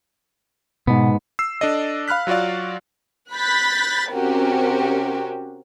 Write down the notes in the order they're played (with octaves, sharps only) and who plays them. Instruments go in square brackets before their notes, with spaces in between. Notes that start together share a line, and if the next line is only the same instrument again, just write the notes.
[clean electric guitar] G#2 B3 [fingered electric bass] B2
[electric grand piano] E6 C7
D4 A4 D5 D#5
F5 B5 F6 F#6 B6
F#3 F4 F#4 D5 F5
[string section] B5 F#6 G6 A6 B6
C3 C#4 F#4 G4 A#4